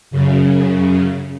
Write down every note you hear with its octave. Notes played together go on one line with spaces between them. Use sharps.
F#2 C#3